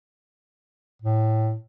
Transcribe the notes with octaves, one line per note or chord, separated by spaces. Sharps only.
A2